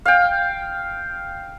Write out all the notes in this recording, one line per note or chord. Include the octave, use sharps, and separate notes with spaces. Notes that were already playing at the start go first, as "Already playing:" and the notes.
F5 G5